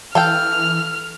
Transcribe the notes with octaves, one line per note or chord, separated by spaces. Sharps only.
E3 A4 F5 G5 F6